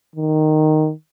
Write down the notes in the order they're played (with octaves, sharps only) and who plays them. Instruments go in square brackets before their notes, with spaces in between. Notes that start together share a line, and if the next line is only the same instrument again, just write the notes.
[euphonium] D#3